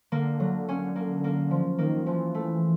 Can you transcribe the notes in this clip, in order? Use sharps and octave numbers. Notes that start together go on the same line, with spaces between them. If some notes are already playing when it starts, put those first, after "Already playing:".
D3 A#3
F#3
C#4
A#3
A#3
F3
D#3 A#3
E3 F3
A3